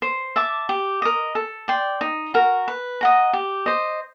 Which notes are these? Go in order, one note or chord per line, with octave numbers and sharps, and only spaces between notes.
C5
E5 A5 D6
G4
A#4 D#5
A4
D5 G5 C6
D#4
F#4 A#4
B4
D#5 F#5 A#5
G4
C5 D#5